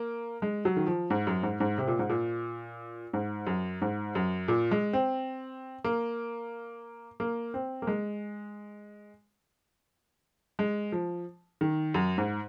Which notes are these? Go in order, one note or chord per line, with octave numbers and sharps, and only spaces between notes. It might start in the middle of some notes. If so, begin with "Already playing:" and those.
Already playing: A#3
G#3
F#3
D#3
F3
G#2
F#2
G#2
G#2
C3
A#2
G#2
A#2
G#2
F#2
G#2
F#2
A#2
G#3
C4
A#3
A#3
C4
A#3
G#3
G#3
F3
D#3
F#2
G#2